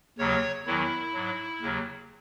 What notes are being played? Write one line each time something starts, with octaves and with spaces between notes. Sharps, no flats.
D#2 C#3 F#3 C#5
E2 D#3 F#3 E4
G#2 F#3
D#2 C#3 F#3